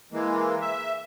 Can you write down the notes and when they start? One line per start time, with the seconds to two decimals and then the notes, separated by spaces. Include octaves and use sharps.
0.12 E3 G#3 A#3
0.61 E5